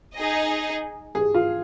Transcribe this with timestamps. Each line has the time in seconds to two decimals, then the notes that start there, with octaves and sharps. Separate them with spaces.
0.16 D#4 G#4 D#5
1.15 G#4
1.34 F4